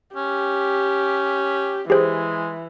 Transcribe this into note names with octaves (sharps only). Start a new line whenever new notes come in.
C#4 G4
E3 G#3 G4 G#4 C5